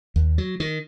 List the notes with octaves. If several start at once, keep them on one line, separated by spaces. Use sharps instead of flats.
D#2
F#3
D#3